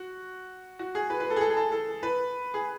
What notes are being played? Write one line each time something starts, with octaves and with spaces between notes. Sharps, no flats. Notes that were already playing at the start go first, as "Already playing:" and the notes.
Already playing: F#4
F#4
G#4
B4
B4
A4
G#4
A4
G#4
A4
A4
B4
G#4